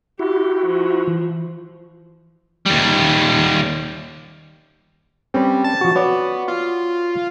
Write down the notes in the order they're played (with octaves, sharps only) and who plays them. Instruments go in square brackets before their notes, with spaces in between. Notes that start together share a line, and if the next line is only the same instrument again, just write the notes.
[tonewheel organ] E4 F#4 [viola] G4
[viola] F3
[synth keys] E3
[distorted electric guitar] D#2 G3
[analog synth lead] G3 [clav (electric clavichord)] C4 C#4 B4
[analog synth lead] A5
[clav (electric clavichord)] F3 F#4
[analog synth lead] B3 [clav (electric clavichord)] F#4 C#5 D5
[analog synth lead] F4